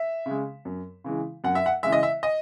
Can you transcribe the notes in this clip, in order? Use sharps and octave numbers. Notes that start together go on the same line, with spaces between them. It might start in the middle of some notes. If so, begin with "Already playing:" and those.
Already playing: E5
C#3 G#3
F#2
C#3 E3 G#3
F#2 F#5
E5
F#5
C#3 E3 G#3 E5
D#5
E5
D#5